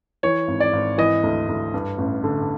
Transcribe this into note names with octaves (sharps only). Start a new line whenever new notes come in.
E3 C#5
G#1
D5
G#1
E3 D#5
D2
D2
G2
A1
D3